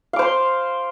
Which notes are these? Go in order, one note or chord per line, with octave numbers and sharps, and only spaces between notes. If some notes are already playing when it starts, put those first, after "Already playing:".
C5 F5 C6 D6